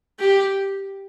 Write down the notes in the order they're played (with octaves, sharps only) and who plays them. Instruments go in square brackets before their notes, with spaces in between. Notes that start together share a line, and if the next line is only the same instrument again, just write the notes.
[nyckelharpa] G4